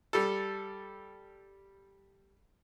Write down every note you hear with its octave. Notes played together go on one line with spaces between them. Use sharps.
G3 A4